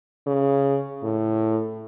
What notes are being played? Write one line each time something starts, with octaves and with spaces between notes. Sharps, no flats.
C#3
A2